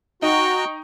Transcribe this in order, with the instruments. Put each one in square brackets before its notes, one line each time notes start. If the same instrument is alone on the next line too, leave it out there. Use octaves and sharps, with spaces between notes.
[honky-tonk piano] D#4 [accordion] F#4 A#5 [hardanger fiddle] G5 C#6